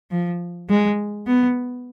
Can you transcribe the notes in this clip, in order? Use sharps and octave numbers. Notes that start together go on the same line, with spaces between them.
F3
G#3
B3